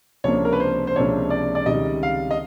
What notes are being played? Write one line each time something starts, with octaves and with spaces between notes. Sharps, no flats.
C#2 C3 F3 A#3 D4 C#5
A#4
B4
C5
C5
C#2 C3 F3 A#3 D4 C#5
D5
D5
C#2 C3 D#3 G3 D#5
F5
D#5